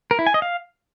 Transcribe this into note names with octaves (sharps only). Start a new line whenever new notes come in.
A#4
E4
G#5
D#5
F5